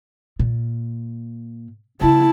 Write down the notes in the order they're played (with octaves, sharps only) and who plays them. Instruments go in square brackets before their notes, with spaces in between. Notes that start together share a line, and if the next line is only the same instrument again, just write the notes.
[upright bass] A#2
[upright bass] C#3 A#3 [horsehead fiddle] E4 [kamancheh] A5